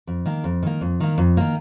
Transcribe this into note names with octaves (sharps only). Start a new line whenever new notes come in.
F2
D#3 A#3
F2
D#3 A#3
F2
D#3 A#3
F2
D#3 A#3